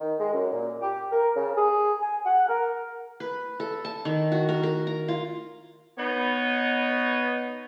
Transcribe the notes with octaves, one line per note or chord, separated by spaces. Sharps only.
D#3
G#3
F#2
A#2
G4
A#4
C#3
G#4
G#5
F#5
A#4
B4
A4
A5
D#3
F#4
A#4
A#4
A#5
F4
B3 D#4 C#5